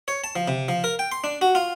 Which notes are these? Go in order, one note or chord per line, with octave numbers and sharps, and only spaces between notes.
C#5
A5
F3
C3
F3
A#4
G5
C6
D4
F#4
F4